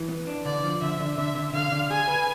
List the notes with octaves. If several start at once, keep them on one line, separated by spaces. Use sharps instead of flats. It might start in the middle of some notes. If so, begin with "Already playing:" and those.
Already playing: E3
B3
D4
D3 D5
F3
D3 E5
D3
D3 E5
D3
D3 F5
D3
G#4 G#5
B4